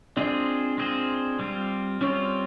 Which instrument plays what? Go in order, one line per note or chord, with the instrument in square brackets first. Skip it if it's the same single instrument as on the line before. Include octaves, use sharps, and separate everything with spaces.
[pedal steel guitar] G#3 C4 F4 G#4 C5 [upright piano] D4
[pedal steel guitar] G#3 C4 F4 G#4 C5
G3 C4 F4
[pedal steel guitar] G3 C4 F4 [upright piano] C#4